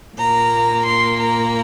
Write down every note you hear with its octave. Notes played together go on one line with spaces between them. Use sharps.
A#2 A#3 A#5
C6
A#5